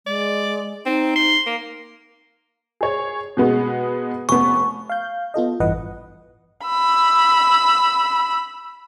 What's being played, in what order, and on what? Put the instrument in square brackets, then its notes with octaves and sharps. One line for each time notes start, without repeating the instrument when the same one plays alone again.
[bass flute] G#3 [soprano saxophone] D5
[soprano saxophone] C4 [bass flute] D#4
[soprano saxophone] C6
A#3
[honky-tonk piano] G#4 C#5
B2 G#3 B3
[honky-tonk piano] F1 B3 [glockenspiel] C#6
[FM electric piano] F5 G6
B3 F4 A4 D#5
A1 G2 E3 B4 D#5 F#5
[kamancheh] B5 E6